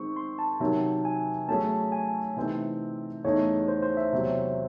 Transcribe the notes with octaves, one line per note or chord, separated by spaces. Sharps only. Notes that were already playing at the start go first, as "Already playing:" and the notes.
Already playing: D#3 G#3 C4 C#6
C6
A5
C3 D#3 F#3
G#5
F#3 A3 C#4 G#4 A5
G#5
C3 E3 A3 C4 D#4
E2 C#3 E3 A3 D#4 C#5
C5
C5
E5
E2 C3 F#3